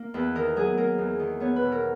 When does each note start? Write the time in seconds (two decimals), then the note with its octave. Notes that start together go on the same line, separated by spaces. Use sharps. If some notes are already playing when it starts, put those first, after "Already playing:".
Already playing: A#3
0.14 E2 B4
0.35 D#3 A#4
0.56 F#3 G#4
0.77 A#3 A#4
0.98 E2
1.19 D#3
1.40 B3 C#5
1.56 B4
1.62 B2
1.72 A#4